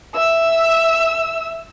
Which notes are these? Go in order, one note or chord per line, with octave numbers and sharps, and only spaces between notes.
E5 E6